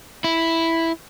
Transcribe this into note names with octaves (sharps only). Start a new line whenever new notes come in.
E4